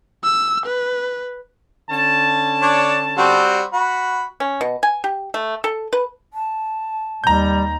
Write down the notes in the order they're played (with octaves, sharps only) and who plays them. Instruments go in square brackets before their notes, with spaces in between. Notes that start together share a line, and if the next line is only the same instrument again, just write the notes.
[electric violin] E6
B4
[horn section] D3 C#4 A5
[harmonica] D4 C#5
G3 C4 F#4
F#4 B5
[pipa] C#4
B2
G#5
G4
A3
A4
B4
[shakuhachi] A5
[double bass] D#2 [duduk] G3 [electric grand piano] A#5 G6